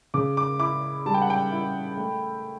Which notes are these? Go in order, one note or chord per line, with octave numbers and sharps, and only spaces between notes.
C#3 D6
D6
E4 D6
G3 A5
G5
F#5
G5
E4
A3